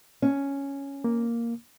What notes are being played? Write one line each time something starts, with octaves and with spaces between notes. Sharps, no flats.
C#4
A#3